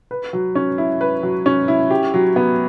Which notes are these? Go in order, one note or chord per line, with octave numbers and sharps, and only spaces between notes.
B4
F#3
C#4
E4
B4
F#3
C#4
E4
G4
F#3
B3